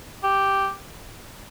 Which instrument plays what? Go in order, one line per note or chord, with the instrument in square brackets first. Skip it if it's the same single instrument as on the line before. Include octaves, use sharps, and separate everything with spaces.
[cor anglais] G4